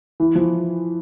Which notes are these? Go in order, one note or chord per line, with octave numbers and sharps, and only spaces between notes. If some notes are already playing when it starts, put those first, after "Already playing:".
E3
F3